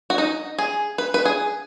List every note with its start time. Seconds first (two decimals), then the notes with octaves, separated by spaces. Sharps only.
0.10 F#4
0.18 D#4
0.58 G#4
0.98 B4
1.14 B4
1.25 G#4